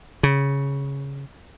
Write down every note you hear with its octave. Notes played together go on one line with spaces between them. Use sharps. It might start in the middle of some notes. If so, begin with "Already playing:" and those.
C#3